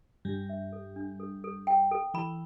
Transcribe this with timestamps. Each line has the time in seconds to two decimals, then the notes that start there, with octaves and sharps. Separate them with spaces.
0.25 G2 G3 D4
0.49 E5
0.72 A4
0.96 D4
1.20 A4
1.44 A4
1.67 G5
1.91 A4
2.14 E3 B5